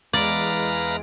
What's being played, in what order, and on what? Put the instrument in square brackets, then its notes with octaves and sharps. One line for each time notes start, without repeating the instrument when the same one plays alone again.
[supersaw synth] E2 G#3 D7 [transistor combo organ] B4 F5 A#5 [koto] D5